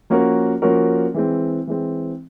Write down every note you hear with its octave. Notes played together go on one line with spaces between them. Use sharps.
F3 A#3 C#4 F#4 A#4
F3 A#3 C#4 F#4 A#4
E3 G#3 C4
E3 G#3 C4